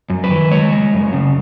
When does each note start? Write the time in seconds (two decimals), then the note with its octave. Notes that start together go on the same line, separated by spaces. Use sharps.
0.10 F#2
0.24 B4
0.30 D#3
0.51 G#3 C#5
0.72 G#3
0.93 F#2
1.13 C#3